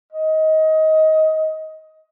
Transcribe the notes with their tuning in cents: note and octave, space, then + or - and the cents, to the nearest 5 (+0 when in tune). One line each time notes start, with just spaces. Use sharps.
D#5 +20